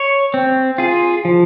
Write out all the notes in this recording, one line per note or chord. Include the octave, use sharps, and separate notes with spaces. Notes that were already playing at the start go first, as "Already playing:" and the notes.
Already playing: C#5
C4
F4 G#4
F3